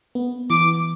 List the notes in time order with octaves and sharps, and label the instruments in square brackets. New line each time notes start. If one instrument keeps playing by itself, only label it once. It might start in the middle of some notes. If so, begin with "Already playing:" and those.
[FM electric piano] B3
[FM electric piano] E3 [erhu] D6